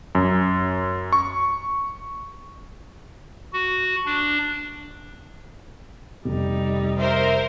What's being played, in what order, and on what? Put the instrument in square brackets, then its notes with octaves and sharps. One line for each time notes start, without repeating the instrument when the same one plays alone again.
[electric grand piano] F#2
C#6
[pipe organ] F#4
D4
[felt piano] F1 [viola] G3 D#4
[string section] A#4 C5 [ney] E5